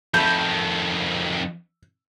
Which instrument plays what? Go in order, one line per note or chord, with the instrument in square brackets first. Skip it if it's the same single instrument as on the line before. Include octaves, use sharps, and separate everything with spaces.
[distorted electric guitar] F2 D#3 [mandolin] A3 A4 B5 [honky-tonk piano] G6